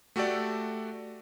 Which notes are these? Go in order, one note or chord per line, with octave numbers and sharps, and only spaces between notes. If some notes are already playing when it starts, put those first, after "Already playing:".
A3 F#4 G4 A4 D5